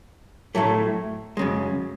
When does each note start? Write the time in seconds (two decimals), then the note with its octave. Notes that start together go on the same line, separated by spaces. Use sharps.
0.55 A2 F#3 A3
1.37 F#2 C#3 G#3